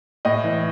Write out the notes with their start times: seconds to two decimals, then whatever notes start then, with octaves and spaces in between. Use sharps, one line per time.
0.25 A2 D#5
0.44 E3